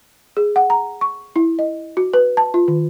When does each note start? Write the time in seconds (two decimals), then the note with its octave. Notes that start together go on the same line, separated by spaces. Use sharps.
0.37 G#4
0.56 F#5
0.70 A#5
1.01 C#6
1.36 E4
1.59 D#5
1.97 F#4
2.14 B4
2.37 A5
2.54 F4
2.68 D#3